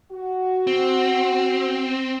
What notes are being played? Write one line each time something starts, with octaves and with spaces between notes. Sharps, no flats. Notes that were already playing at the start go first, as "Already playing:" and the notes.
F#4
C4